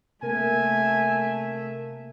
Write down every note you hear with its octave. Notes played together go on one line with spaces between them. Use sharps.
C3 A3 A#3 A#4 E5 G#5